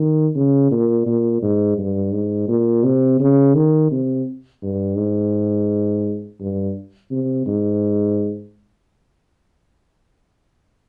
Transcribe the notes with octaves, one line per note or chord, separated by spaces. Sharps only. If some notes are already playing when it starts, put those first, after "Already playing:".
Already playing: D#3
C#3
A#2
A#2
G#2
G2
G#2
A#2
C3
C#3
D#3
C3
G2
G#2
G2
C3
G#2